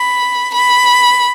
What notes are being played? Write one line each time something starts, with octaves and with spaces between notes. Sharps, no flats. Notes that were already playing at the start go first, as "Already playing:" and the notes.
Already playing: B5
B5